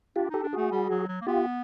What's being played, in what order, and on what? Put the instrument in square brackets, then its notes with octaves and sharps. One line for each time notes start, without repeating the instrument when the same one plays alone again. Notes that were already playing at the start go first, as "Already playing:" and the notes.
[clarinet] D4 [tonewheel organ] F4 G4
[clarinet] D#4 [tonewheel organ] G4 A4
[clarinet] D4
[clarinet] A3 [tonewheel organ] F#4 G#4
[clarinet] G3
F#3
F#3
A#3
[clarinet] B3 [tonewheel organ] F4 G4